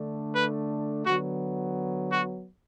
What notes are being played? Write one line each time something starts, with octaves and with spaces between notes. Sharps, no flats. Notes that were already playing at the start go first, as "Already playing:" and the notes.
Already playing: D3 A3 D4
B4
D3 F#3 B3 F#4
F#4